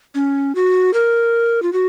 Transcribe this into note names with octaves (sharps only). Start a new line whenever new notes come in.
C#4
F#4
A#4
F4
F#4